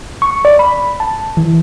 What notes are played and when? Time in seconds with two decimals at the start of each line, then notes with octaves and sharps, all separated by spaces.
0.22 C#6
0.45 D5
0.59 B5
1.00 A5
1.37 E3